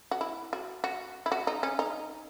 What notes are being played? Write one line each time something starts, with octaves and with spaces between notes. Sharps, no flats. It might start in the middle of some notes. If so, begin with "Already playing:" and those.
F#4
E4
F#4
F#4
E4
F#4
D#4
C#4
D#4